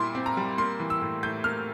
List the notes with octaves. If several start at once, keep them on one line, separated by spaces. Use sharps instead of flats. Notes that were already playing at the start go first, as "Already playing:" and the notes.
Already playing: A#2 G3 E4 C6 D6
C4
A#5
G3
A#3 C6
E3
E6
A2
A2 G6
A#3 F6